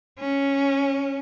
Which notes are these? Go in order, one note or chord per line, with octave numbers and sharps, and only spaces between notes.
C#4